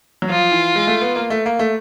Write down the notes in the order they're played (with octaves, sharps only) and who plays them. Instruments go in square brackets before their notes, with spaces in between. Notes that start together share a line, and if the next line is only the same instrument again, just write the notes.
[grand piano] F#3
[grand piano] F3 [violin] F4
[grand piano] E3
G#3
A3
B3
A#3
A3
A#3
A3